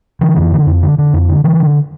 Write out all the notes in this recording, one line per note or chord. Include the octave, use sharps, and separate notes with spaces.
D3 E3
F2
D3
F2
D3
D3
F2
D3
D3 E3
D3